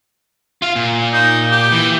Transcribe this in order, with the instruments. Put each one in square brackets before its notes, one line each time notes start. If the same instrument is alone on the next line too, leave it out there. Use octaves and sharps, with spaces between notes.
[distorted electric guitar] F4 F5
A#2
[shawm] D#4
G4
[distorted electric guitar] E3